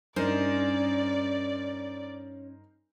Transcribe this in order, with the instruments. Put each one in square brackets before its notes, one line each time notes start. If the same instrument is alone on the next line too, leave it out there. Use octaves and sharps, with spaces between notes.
[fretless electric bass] G2 [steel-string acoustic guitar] C#4 [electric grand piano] D#4 A#4 C5 [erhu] D5